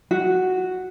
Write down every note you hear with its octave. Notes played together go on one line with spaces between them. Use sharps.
F#4